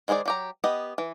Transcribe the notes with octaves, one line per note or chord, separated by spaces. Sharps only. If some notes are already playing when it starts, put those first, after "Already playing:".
D#3 G#3 G#4 C5 D5
F#3 G4 A#5
B3 G4 D#5
E3